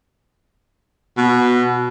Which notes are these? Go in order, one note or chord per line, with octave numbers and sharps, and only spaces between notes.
B2